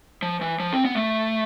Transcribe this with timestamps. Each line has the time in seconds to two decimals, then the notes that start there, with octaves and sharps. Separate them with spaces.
0.22 F3
0.41 E3
0.60 F3
0.73 C4
0.85 B3
0.96 A3